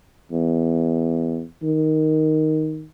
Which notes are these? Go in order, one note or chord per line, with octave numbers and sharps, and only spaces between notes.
E2
D#3